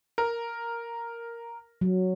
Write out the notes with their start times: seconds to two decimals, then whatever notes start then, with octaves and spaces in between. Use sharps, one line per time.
0.18 A#4
1.81 F#3